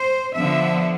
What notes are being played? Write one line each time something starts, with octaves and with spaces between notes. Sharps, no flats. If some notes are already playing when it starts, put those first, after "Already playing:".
Already playing: C5
D3 F3 B3 E5